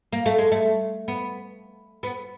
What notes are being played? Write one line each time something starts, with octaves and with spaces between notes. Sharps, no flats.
A#3
A3
G#3
A3
B3
B3